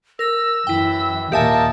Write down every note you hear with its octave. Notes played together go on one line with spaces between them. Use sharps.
A#4 E6 A#6
F#2 E3 E4 G5
D#2 A#2 A#3 G4 D#5 E5 G#5 A5